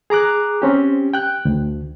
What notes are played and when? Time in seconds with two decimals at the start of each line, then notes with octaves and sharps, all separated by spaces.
0.10 G#4 A#5 D6 F#6
0.62 C4 C#4 G4
1.14 G5 F#6
1.45 D2